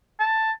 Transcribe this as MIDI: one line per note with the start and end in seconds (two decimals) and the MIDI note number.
0.20 0.51 81